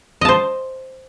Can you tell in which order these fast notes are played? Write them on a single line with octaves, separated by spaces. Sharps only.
D#5 A5 C5